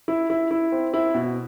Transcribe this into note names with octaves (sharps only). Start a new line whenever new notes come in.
E4
E4
E4
C4
E4
B2